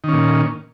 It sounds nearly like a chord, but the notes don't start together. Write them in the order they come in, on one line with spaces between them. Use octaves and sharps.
D#3 C#4 A#2